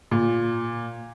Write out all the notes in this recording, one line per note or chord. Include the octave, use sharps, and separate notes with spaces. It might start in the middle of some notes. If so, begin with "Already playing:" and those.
A#2